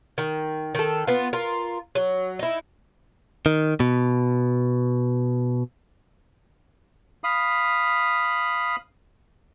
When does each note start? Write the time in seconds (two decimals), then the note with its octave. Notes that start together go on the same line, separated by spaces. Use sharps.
0.18 D#3
0.75 D#3 A4
1.07 B3 F4
1.33 F4 A#4
1.95 F#3
2.39 D#4 E4
3.46 D#3
3.80 B2
7.24 F5 B5 D#6